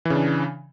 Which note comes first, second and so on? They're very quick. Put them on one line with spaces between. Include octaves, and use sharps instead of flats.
E3 C#3 D4